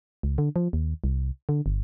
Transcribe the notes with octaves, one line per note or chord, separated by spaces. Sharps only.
C#2
D3
F3
D#2
C2
D3
G1